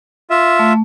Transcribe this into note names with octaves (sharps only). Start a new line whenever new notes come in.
F4 E5
A3